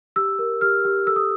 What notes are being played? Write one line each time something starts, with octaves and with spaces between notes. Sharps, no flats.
G4 E6
A#4
G4 F6
G4
A4 E6
D#6